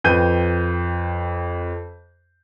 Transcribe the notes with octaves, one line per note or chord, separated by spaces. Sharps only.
F2 B4 G5 G6 D#7